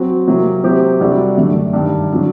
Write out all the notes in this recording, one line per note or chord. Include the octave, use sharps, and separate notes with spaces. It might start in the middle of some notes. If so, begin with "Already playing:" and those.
Already playing: F#3 C4 F#4 C5
C3 F#3 A#3
C3 F#3 C4 G4 C5
C3 G3 D4 F#4 A4
F#2 D3 A3
G2 D#3 G3
D3 F#3